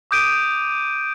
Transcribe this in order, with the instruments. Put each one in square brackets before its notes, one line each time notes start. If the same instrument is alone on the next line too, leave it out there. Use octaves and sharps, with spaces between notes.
[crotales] D6 D#6 G6 D7 D#7